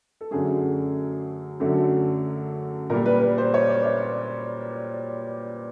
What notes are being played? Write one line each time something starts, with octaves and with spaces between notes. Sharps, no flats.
A4
F#2 D3 F#3 A3 G#4
F#2 D3 F#3 A3
A#2 G3 A#4
B4
B4
C5
C#5
D5
C#5
D5